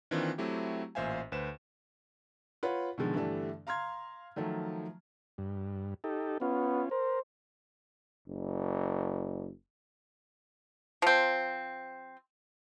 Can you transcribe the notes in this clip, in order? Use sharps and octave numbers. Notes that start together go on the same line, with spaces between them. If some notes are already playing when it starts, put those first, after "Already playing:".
D#3 E3 A#3 C4 D4 F4
F#3 A3 C4 E4 G4
A1 A#2 C5 E5 F5 G#5
D2 B4 C5 E7
F4 B4 C#5 F#5 B5
B2 D3 D#3 F3 G#3
G2 D3 E3 G3 A3 D4
F5 A#5 C6 F6 G#6
D#3 F3 F#3 A3
G2
D#4 G4 A4
B3 C#4 F4
A#4 C5
F#1
F3 C4